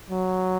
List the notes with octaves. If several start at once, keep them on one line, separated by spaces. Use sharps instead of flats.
F#3